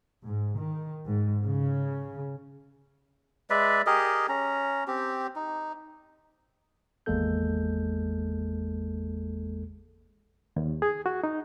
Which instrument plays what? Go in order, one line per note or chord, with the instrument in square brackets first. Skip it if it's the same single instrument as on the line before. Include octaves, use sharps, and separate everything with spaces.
[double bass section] G#2
D#3
G#2
C#3
[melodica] G#3 B4 D5 E5
G4 G#4 A#4 D#5
C#4 A#5
C4 G4
D#4
[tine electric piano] G#1 E2 G#3 A#3 A4 G6
[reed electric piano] D#2
G#4
F#4
D#4